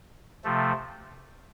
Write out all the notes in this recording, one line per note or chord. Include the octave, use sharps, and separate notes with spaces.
C3 F3 A3